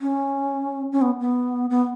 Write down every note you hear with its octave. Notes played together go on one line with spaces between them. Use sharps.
C#4
C#4
B3
B3
B3